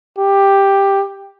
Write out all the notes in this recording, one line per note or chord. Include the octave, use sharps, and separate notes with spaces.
G4